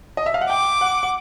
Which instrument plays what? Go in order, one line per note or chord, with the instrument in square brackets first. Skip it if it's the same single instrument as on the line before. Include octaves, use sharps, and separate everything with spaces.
[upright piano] D#5
E5
F5
F#5
[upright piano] G5 [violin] D6
[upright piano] F#5
F#5